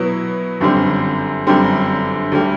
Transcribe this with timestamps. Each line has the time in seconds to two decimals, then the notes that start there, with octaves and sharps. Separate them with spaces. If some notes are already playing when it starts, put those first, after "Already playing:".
Already playing: B2 F#3 B3 E4
0.60 G1 F#2 D3 G3 C4
1.47 G1 F#2 D3 G3 C4
2.32 D2 D3 G3